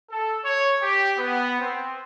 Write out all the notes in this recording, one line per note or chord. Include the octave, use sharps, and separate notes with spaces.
A4
C#5
G4
B3
C4